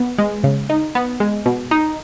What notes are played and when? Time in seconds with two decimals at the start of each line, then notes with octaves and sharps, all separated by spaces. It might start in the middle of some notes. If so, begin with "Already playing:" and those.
Already playing: B3
0.18 G#3
0.44 C#3
0.70 D#4
0.95 B3
1.20 G#3
1.46 B2
1.71 D#4